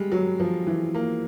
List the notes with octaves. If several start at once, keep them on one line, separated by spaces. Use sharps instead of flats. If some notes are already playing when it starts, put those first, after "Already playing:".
Already playing: G3 G#3
F#3
F3
E3
A#3